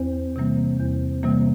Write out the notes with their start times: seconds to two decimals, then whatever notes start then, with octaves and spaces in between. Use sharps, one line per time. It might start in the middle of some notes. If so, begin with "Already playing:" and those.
Already playing: E2 C4
0.36 C3 E3 G3 A#3
0.80 E2
1.23 C3 E3 G3 A#3